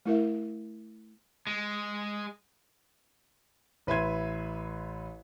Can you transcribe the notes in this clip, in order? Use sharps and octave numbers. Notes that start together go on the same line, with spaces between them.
A3 E4 A#4 E5
G#3
A1 B4 E5 C6 G#6 D#7